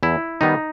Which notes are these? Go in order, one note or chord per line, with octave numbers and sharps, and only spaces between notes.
E2 E4
D#3 G3 B3 D#4